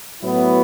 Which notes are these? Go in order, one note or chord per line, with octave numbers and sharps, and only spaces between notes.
A2 F#3 B3 E4